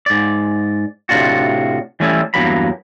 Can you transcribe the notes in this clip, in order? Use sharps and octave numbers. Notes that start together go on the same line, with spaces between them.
G#2 D5
A2 C3 D#3 D4 F4 F#4
E3 G3 A3 C#4 E4
E2 G2 F#3 A#3 B5